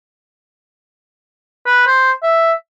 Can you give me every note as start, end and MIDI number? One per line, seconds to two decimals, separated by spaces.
1.66 1.84 71
1.87 2.12 72
2.23 2.52 76